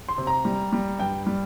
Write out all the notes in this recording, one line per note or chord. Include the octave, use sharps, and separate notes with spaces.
C6
C3
A#5
G3
G3
G2 G5
G3